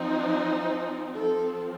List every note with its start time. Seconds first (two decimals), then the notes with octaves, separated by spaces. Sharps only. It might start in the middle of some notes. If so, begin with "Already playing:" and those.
Already playing: F3 C4 D#4
1.16 F3 C4 A4